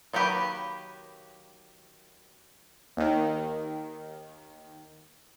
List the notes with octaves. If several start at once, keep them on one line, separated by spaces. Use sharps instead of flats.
D#3 F#3 A#3 G4 B4
D#2 D#3